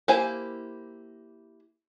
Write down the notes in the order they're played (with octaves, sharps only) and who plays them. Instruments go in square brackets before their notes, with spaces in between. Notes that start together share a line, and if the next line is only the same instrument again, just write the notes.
[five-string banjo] A#3 E4 G4 C5 G#5